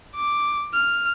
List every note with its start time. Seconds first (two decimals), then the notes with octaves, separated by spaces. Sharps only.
0.15 D6
0.74 F6